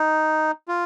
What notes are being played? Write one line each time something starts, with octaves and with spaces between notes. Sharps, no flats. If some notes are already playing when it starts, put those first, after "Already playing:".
Already playing: D#4
F4